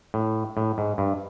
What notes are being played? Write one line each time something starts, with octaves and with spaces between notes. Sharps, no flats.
A2
A2
G#2
G2